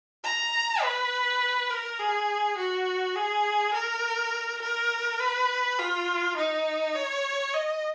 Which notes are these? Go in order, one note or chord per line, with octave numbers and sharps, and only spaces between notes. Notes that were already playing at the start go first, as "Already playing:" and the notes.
A#5
B4
A#4
G#4
F#4
G#4
A#4
A#4
B4
F4
D#4
C#5
D#5